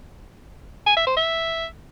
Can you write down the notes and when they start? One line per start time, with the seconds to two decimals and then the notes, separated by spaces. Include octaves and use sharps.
0.86 G#5
0.97 E5
1.07 C5
1.17 E5